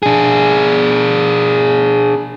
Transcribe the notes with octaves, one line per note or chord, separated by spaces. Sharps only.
D4 G#4